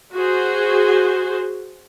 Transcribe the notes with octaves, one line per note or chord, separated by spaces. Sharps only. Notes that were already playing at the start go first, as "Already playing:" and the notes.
F#4 G#4 C5